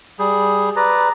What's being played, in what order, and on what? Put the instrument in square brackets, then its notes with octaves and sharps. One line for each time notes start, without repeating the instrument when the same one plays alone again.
[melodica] G3 G#4
B4 D5 A#5